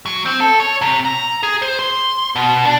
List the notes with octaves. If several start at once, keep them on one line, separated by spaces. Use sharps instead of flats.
F#3
C4
A4
C#5
C3
A#5
G#4
C5
C6
B2
D4